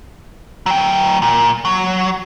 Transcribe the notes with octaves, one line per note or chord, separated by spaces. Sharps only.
F#3 G5
A#2
F#3